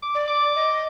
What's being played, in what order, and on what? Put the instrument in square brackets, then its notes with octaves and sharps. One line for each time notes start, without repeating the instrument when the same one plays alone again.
[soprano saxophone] D6
[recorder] D5
[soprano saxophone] D6
[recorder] D#5